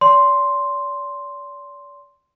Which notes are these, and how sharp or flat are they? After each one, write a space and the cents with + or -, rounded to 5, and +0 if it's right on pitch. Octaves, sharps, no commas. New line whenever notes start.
D5 -40 C6 +0